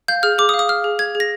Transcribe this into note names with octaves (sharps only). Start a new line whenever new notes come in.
F5 G6
G#4 F6
G#4 D6
D#6
F5
D#6
F5 F6
G#4
G#4 G#6
G#4
A#6